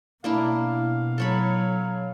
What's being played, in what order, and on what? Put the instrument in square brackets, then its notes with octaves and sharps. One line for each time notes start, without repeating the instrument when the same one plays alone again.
[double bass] B2 [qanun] A#3 D4 E4 [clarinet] F5
[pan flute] F#3 [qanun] A4 C#5 B5